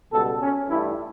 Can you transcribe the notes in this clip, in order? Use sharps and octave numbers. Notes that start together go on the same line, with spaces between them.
C#2 B2 G3 A4
C#4
G2 E3 A3 E4